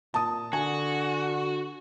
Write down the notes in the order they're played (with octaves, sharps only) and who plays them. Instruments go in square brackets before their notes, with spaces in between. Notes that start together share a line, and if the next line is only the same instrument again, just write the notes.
[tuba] A#2 [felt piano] A5 D#6
[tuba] D3 [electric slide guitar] F#4 [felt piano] G#5